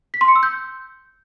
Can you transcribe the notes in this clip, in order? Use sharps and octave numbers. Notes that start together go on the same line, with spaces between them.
B6
C6
C#7
E6
G6